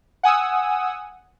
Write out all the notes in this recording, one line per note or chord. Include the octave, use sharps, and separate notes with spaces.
F#5 G#5 D#6 E6